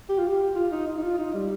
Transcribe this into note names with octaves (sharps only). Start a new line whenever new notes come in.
G4
F4
G4
F4
D#4
D#4
D#4
F4
D#4
G3